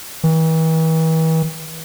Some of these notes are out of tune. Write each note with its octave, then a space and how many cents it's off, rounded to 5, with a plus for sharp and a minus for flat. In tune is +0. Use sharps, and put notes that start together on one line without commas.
E3 -40